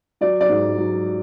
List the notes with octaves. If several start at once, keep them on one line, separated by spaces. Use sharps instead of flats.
F#3 D5
D5
G#2
F#3